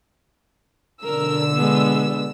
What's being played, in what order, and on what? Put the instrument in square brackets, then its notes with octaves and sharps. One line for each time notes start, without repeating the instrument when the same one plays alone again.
[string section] B2 D3 E6 [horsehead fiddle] A#4
[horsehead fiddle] G#3 B3